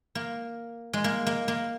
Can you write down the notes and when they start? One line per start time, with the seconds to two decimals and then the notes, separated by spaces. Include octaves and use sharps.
0.15 A#3
0.93 G#3
1.04 A#3
1.27 A#3
1.48 A#3